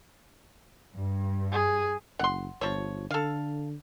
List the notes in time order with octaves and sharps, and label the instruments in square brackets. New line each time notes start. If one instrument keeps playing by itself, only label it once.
[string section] G2
[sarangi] G#4
[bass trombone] F#1 [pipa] F#5 C6
[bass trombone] G1 [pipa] F3 C#5
[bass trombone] D3 [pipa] A4 F5